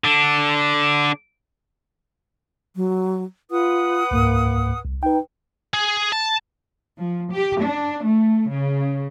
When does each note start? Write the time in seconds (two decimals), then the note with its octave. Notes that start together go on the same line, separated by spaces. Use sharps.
0.04 D3 D4
2.76 F#3
3.51 F4 B4 F#5 D#6
4.11 C#2 G#2 A#3
4.85 C2
5.03 D#4 B4 G5
5.74 G#4
6.12 A5
6.98 F3
7.33 G4
7.62 D4
8.03 A3
8.51 C#3